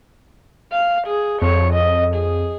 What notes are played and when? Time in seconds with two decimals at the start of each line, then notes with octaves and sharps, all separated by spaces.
0.72 F5
1.07 G#4
1.42 F2 C#5
1.73 D#5
2.15 G#4